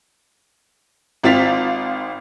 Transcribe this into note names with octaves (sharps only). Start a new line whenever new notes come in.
G#1 C4 F4 A6 B6 F7